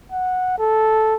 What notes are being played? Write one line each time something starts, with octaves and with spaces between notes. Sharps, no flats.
F#5
A4